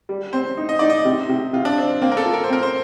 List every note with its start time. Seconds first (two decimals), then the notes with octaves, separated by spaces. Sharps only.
0.09 G3
0.33 C4 C5
0.57 D#4
0.69 D#5
0.79 D#4 D5
0.90 D#5
1.05 C3
1.29 C3
1.53 C3 F4
1.65 D4
1.77 C4 D4
2.02 A#3 C4
2.12 A#4
2.17 A4
2.26 F4
2.33 A#4
2.44 C5
2.50 C4 A#4
2.63 C5